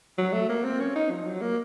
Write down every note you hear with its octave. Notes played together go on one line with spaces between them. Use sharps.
F#3
A3
A#3
C4
C#4
D#4
F3
F#3
A#3